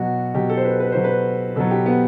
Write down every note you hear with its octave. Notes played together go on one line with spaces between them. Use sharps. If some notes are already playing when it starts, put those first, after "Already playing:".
Already playing: B2 F#3 F#4
B2 F#3 G4
A4
C5
B4
B4
B2 F#3 C5
B4
B2 F#3 A4
G4
B3